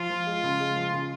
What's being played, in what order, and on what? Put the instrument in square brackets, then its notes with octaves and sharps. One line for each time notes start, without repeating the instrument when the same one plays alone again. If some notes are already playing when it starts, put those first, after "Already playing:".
Already playing: [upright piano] F3 [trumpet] F4
[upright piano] F3
G#3
C#3
G#3
F3
C#3